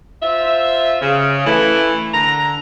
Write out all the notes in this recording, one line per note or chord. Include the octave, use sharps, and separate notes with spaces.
F4 C5 E5
C#3
E3 A3
D3 A#5